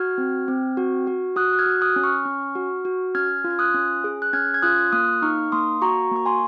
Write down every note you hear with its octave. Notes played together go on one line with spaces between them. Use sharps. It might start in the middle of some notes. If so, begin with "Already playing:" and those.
Already playing: F#4 F6 G#6
C4
C4
F#4
F#4
F#4 D#6 F#6
F#6
F6 G#6
F#4
D#6 F#6
C#4
C#6 F6
C#4
F#4
F#4
C#4 F6 G#6
F4
G#6
D#6 F#6
C#4
G#4
F#6
C#4 F6 G#6
G#6
F4 D#6 F#6
A#3 D#6 F#6
D#4 C#6 F6
A#3 C6 D#6
F#4 A#5 C#6
A#3 C#6
G#5 C6